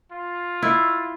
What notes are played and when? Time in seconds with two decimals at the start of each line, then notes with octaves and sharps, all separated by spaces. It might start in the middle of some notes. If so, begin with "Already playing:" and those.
0.12 F4
0.62 E4